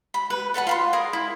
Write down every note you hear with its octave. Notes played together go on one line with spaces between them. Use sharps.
B5
B4
A4 B4 F#5 A5
F4 B5 C6
G#4 A#4 G#5 D#6
E4